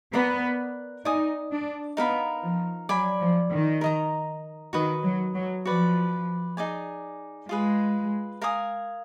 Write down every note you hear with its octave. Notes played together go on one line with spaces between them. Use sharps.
B3 A#4 D5 F#5 B5
D#4 D5 G#5 D#6
D4
B3 D#4 A#4 F5 B5
F3
F#3 D5 G#5 B5
F3
D#3
A#4 D#5 A#5
D#3 F#4 B4 D#5
F#3
F#3
F3 F#4 B4 D5
D#4 G#4 D5 G#5
G#3 F4 G#4 B4
A#4 F5 G#5 D#6